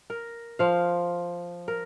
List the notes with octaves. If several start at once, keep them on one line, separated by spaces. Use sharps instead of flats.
A#4
F3 F5
A#4